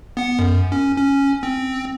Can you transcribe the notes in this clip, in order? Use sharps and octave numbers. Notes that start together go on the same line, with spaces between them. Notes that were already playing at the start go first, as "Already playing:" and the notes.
B3 F#5
F#2
C#4
C#4
C4